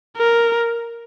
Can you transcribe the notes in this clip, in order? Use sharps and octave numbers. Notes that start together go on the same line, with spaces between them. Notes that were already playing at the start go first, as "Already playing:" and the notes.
A#4